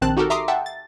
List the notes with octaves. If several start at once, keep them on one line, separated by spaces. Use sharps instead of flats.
A#1 D#3 C4 A5 F#6
D#4 F#4 G4 A4 A#4
E5 A#5 C6 D6 D#6 C7
E5 F#5 G5 A5
A6